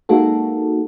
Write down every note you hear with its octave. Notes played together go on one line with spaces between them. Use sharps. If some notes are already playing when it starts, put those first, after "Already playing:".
G#3 A#3 D#4 F#4 A4